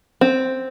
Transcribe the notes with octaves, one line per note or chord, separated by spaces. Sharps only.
C4